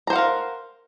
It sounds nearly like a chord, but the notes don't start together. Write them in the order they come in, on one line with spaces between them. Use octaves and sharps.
A#5 C5 F#5 F5 A#4